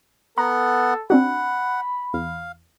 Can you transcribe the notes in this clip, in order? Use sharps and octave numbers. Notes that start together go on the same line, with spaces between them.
B3 A4 F#5 A#5
C4 D4 F#4 F#5 B5
E2 F5